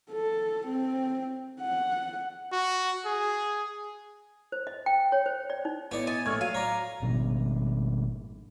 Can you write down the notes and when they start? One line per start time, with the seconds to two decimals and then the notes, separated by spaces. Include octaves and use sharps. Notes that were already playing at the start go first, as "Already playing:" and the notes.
0.11 A4
0.67 C4
1.61 F#5
2.52 F#4
3.05 G#4
4.52 C5
4.67 D#5
4.86 G5
5.12 C#5
5.26 C5
5.50 D5
5.65 D#4
5.91 A2 B3 C#5 D5
6.07 D#5 G#5 A6
6.26 A#1 A2 C#6 F6 G#6
6.41 F#3 F5 D#7
6.55 C#5 D5 A#5
7.02 G#1 B2